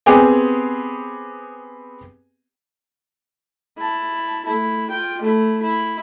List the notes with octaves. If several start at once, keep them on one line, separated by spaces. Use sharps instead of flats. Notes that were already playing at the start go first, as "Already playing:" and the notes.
B3 C4 G4 G#4 G5 G#5
E4 A5
A3 E4
F4 G5
A3 E4
E4